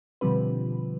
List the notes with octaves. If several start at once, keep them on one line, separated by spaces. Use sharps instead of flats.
B2 D3 F3 G3 C4 B4